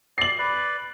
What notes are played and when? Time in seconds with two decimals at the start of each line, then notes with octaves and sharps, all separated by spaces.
0.18 D5 C7 F#7
0.39 B4 D5